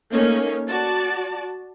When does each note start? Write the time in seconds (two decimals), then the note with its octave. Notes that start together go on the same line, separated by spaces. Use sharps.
0.13 A3 A#3 C#4 D#4
0.67 F#4 D5 A5